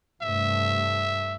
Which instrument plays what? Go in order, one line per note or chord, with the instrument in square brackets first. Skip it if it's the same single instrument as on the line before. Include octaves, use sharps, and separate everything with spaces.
[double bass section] G2 C3 A3 [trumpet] E5